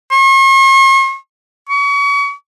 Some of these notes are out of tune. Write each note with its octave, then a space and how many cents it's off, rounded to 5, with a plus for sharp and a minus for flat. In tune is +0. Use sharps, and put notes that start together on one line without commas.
C#6 -45
C#6 +35